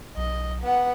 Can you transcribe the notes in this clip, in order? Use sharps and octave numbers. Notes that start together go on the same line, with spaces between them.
B1 D#5
B3 F#5